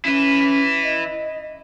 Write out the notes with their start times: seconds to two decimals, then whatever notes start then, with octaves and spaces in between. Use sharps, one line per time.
0.05 C#4 E4 B4
0.84 D#5